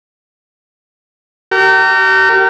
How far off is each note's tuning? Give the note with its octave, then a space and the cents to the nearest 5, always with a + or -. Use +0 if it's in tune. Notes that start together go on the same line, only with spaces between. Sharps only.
G4 -40 A#4 -25